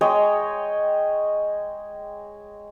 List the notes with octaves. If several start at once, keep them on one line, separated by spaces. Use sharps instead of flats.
G#3 C#5 D#5 G5